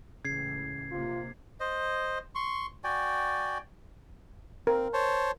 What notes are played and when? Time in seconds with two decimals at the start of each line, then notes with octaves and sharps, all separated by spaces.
0.25 C#2 A2 C#3 E3 G#6 C7
0.91 A#1 C3 A#3 F4
1.60 C5 D#5
2.35 C6 C#6
2.84 F#4 D5 G5 G#5
4.67 C4 A#4
4.93 C5 C#5 A5